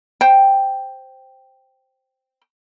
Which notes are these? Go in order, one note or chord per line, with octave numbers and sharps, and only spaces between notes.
C5 G5